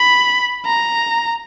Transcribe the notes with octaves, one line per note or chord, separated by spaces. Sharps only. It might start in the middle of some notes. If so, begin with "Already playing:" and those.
Already playing: B5
A#5